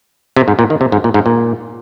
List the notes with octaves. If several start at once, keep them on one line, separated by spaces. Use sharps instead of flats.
C3
G#2
A#2
D#3
C3
G#2
A#2
G#2
A#2